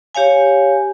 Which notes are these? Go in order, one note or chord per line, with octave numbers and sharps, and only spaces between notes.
G4 C#5 F5 G#5